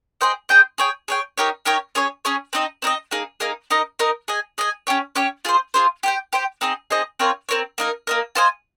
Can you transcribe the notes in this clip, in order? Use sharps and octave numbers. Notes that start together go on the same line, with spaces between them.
G#4 C5 D#5 G5
G#4 C5 D#5 G5
G#4 C#5 G5
G#4 C#5 G5
D#4 G4 A#4 C#5
D#4 G4 A#4 C#5
C#4 G#4 C#5
C#4 G#4 C#5
C4 D#4 A#4 D#5
C4 D#4 A#4 D#5
A#3 D#4 G#4
A#3 D#4 G#4
D#4 A#4 D#5
D#4 A#4 D#5
G#4 D#5 G#5
G#4 D#5 G#5
C#4 G4 C#5
C#4 G4 C#5
F4 G#4 C5
F4 G#4 C5
G4 C5 G5
G4 C5 G5
C4 D#4 G#4 D#5
C4 D#4 G#4 D#5
C4 F4 A#4 C#5
C4 F4 A#4 C#5
A#3 D#4 A#4
A#3 D#4 A#4
F4 C5 D#5 G#5